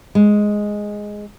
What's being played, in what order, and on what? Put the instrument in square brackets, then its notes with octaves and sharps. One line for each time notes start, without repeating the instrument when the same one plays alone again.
[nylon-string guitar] G#3